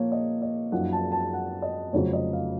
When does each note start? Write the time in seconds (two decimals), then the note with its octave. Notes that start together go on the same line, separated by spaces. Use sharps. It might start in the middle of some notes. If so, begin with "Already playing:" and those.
Already playing: A#2 F3 A#3 C#5
0.12 D#5
0.42 D#5
0.72 F#2 F3 A#3 D#4 F#5
0.93 A5
1.12 A5
1.33 F#5
1.62 D#5
1.93 F1 F2 C#3 F#3 C#5
2.13 D#5
2.33 F5